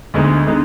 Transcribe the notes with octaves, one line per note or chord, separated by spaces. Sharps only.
D2 D3 G#3 B3 D#4
D3 G#3 B3 D#4